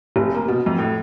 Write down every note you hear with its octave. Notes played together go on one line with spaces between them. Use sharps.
F1
A#3
B2
F2
A2